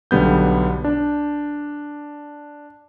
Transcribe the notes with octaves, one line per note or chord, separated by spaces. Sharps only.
B1 D3 G3 B3 G6
D4